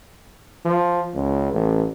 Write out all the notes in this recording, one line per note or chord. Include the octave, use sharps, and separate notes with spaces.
F3
C#2
A1